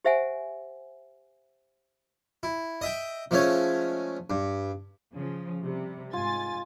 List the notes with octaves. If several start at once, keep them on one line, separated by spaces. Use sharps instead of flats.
G4 C5 E5 F#5 G#5
E4
D#5 E5 G5
F3 G#3 A3 C#4 C#5
G2
C#3 F3
C3 G3
G#2 F4 G#5 A6